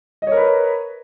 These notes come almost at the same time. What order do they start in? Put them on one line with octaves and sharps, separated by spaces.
D#5 C#5 A#4 B4